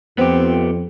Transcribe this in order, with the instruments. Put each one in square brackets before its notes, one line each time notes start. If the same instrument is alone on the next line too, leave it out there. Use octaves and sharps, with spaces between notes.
[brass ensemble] F2 [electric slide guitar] B3 G4 [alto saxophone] C4